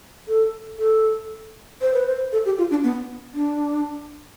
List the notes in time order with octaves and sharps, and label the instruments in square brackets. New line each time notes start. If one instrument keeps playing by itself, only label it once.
[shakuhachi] A4
A4
C5
B4
C5
A4
G4
F4
D4
B3
D4